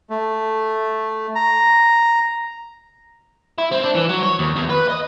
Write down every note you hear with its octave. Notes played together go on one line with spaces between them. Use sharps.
A3
A#5
E4
C4
D4
E3
F#3
C#5
D#2
E2
B4
D#5